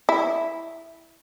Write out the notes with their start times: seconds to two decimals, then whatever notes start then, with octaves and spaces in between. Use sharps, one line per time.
0.09 E4